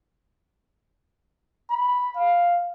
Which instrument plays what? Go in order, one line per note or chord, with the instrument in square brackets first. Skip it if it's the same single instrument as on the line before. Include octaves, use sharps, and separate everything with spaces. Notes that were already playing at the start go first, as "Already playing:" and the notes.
[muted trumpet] B5
F5